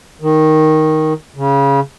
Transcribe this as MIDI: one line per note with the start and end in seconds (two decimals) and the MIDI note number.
0.22 1.13 51
1.36 1.80 49